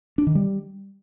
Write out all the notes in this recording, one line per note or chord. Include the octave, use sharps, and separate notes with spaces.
D4
D#3
G3